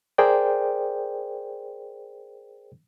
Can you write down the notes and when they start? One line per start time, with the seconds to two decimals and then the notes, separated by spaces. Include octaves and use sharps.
0.18 G#4 A#4 C5 D5 G5